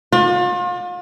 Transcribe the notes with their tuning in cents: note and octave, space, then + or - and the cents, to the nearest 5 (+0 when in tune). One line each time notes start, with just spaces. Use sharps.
F4 +40 D5 +15